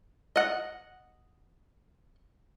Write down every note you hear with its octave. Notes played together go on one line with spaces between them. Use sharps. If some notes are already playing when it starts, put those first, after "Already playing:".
D#5 F#5